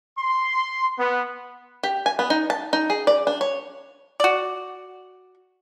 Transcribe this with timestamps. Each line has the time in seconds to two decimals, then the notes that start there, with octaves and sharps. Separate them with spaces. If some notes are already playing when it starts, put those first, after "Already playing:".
0.18 C6
0.97 B3
1.83 G4
2.06 G#5
2.19 B3
2.30 D#4
2.50 A5
2.73 D#4
2.90 G#4
3.07 D5
3.27 D4
3.41 C#5
4.20 F#4 D5